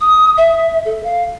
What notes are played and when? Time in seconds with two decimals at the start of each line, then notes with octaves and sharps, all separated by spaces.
0.01 D#6
0.38 E5
0.85 A4
1.04 F5